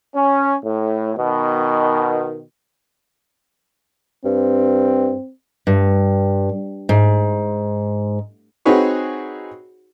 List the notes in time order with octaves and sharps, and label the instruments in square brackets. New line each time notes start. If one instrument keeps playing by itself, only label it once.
[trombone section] C#4
A2
B2 D#3
[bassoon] G2 [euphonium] C4
[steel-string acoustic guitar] G2
G#2
[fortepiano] C4 D#4 F#4 G#4 B4 C#5